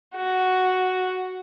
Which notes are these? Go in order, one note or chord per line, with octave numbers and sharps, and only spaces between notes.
F#4